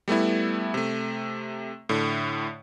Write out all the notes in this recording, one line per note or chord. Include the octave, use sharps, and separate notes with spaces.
G3 A3 B3 E4
C3 A3
A2 D3